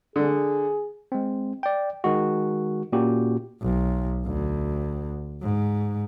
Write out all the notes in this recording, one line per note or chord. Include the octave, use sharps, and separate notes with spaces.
D3 G#4
G#3 C4
D5 G5
D#3 G#3 F#4
A#2 A#3 C#4 F#4 G4
B1
D2
G#2